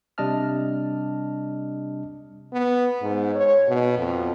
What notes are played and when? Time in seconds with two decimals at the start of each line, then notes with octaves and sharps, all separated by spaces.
0.18 C3 G3 D4 D#5 A5 F6
2.53 B3
3.02 G#2
3.35 C#5
3.68 B2
3.98 F2